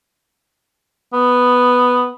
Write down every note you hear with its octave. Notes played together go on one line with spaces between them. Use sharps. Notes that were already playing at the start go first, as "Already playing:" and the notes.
B3